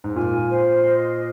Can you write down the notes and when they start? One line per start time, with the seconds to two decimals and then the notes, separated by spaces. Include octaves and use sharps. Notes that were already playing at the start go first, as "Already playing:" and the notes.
0.04 G#2
0.15 A#2 G#5
0.51 C5
0.85 D#5